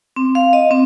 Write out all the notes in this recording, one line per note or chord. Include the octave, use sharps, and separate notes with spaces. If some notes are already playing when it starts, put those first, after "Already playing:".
C4
F5
D#5
C4